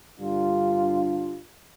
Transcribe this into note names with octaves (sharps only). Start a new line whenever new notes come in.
G2 D3 G3 D4 F4